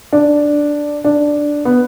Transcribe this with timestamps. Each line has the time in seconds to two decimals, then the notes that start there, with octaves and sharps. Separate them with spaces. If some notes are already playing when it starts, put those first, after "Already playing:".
0.13 D4
1.04 D4
1.65 B3